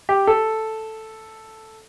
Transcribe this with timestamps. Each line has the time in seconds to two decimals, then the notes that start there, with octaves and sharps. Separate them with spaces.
0.09 G4
0.27 A4